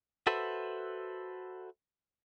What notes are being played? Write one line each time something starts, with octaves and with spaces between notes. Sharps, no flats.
F#4 A4 B4 C5 E5